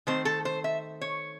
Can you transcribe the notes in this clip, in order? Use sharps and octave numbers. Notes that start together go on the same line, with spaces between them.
D#3 A3 C4 C5
A4
C5
E5
C#5